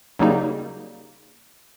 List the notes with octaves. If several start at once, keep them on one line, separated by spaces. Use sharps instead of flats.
C#3 F#3 G3 A#3 D#4